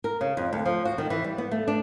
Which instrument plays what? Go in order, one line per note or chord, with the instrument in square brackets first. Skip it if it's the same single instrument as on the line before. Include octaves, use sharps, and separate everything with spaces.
[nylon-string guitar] A#4
C#3
F2
D2
F3
F#4
D#3
E3
G3
B3
A3
D4